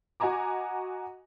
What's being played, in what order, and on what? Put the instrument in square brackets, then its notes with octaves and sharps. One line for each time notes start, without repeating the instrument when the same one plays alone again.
[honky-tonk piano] F#4 D#5 G#5 A#5 D6